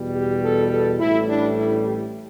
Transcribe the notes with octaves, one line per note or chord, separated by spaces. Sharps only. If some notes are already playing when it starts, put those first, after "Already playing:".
Already playing: E2 B2 G3
G4
A4
A4
A1 A2 G3 E4
D4
E4
G4